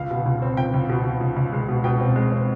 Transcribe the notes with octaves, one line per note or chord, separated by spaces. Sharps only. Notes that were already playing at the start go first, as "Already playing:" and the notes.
Already playing: C#2 F5
B2
C#2
C4
C#2 G5
C#2
B2
B2
C#2
C#2
G#3
B2
B2 G5
C4
G#3
C4